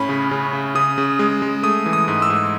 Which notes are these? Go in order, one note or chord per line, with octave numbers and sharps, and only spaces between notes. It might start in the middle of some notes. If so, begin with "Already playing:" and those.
Already playing: A2 C#4 B5
C#3
C#3
C#3
C#3 D#6
C#3
G#3
G#3
A3 D#6
E3
D#6
G#2
E6
G#2